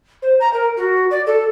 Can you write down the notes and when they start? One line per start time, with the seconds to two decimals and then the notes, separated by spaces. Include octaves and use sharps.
0.22 C5
0.40 A#5
0.54 A#4
0.77 F#4
1.11 D5
1.27 A4